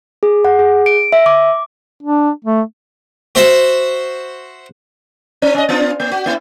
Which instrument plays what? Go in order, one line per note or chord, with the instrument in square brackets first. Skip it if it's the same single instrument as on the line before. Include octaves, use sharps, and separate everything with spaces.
[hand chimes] G#4
F#5
G#4
D7
E5
D6
[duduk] D4
A3
[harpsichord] F#4 C5 E5 F#5
[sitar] C4
C#4 D#5
B3 D4 F4
A#3
F#4
A#3 E4